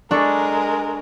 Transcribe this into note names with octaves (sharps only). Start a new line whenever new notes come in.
G#3 D4 A4 A#4 C#6